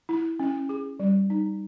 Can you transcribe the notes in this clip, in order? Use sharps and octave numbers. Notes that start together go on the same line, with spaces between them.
E4
C#4
G#4
G3
D#4